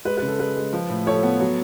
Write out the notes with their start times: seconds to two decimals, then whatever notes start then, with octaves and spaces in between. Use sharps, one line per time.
0.05 G#3 B4
0.17 B4
0.22 C#3
0.28 A4
0.39 G#3 B4
0.56 G#3
0.73 F3
0.90 A2
1.06 F3 A4 C#5
1.23 B3
1.40 F#3